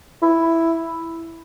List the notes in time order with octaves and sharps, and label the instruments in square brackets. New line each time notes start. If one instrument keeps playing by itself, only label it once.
[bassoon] E4